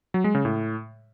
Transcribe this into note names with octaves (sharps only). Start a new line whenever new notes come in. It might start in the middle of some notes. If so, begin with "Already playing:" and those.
F#3
G#3
C#3
A2